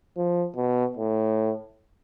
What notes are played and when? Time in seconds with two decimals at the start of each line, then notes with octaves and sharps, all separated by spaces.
0.17 F3
0.56 B2
0.97 A2